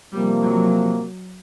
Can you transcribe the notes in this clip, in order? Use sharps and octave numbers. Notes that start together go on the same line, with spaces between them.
C3 F3 G3 A#3
F#3